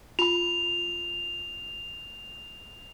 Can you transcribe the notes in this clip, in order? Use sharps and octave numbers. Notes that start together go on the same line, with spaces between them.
F4 B5 F7